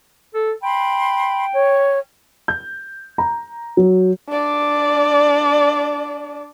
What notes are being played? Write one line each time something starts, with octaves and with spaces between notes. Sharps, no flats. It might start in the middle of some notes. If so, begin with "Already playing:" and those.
A4
G5 B5 C6
C#5
G6
A#5
F#3
D4 D5